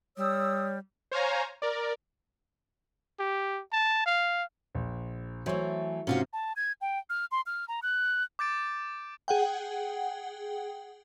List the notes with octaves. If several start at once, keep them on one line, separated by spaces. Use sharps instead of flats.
G3 C#5 D#6 E6
C5 C#5 F5 G#5 A#5
A#4 D5
G4
A5
F5
A#1
E3 F#3 A3 C5 C#5
G#2 C3 C#4 F4 F#4
A5
G#6
G5
F6
C6
F6
A#5
F#6
D6 G6 A6 D7
G#4 F#5 G5